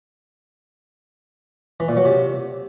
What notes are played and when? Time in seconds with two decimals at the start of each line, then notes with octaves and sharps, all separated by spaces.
1.80 E3
1.88 A#2
1.97 F#3
2.05 C3